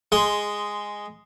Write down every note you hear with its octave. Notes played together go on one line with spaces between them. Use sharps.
G#3 C6